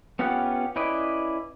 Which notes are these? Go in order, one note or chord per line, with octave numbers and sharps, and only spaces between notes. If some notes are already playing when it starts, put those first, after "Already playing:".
B3 C#4 F4 G4 F#5
C#4 E4 B4 D5 D#5